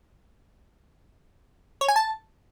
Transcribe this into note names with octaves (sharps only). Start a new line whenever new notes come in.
C#5
G#5
A5